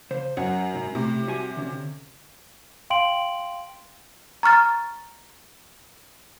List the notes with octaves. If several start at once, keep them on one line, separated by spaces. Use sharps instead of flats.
C#3 C5
F#2 C#5 F#5
C2 G#2
A2 C3
G3 F#4 G#5
D3 C#4
F5 G5 C6 D7 F#7
A#5 C#6 F6 A6